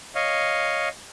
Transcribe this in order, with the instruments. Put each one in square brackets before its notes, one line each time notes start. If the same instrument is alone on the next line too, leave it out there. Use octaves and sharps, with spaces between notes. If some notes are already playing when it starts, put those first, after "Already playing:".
[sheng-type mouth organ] C#5 D#5 F5